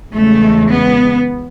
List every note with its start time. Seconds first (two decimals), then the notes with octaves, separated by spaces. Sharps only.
0.13 E2 C#3 G#3 A3
0.68 B3